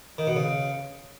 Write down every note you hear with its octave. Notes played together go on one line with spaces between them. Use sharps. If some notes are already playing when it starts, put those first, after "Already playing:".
D#3
B2
C#3